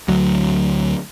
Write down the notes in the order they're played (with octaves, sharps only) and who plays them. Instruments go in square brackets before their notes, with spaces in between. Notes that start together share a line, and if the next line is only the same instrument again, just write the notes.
[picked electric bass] D2 F#3